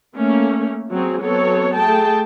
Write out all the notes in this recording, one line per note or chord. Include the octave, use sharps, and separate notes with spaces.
A3 A#3 C#4
F#3 C4 G#4
F#3 B3 C4 A4 C#5
A3 G#4 G5 A5